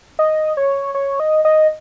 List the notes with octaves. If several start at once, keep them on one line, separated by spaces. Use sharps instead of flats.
D#5
C#5
C#5
D#5
D#5